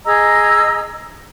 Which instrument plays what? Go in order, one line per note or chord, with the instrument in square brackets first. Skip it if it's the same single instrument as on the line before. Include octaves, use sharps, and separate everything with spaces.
[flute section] G#4 D#5 A#5 E6